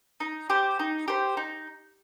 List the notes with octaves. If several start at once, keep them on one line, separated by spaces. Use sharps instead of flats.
D#4
G4 C5
D#4
G4 C5
D#4